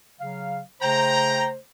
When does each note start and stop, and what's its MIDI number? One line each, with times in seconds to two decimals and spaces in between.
0.21 0.61 49
0.21 0.61 54
0.21 0.61 77
0.81 1.56 49
0.81 1.56 57
0.81 1.56 72
0.81 1.48 79
0.81 1.48 82